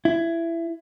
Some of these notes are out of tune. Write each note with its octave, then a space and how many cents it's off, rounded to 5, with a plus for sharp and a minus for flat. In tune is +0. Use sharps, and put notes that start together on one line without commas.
E4 +20